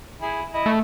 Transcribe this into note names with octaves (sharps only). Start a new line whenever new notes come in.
E4 G#4
E4 D#5
A3